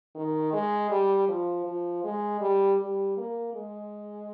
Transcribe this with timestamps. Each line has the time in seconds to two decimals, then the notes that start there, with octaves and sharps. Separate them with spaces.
0.15 D#3
0.53 G#3
0.90 G3
1.28 F3
1.66 F3
2.04 G#3
2.41 G3
2.80 G3
3.17 A#3
3.54 G#3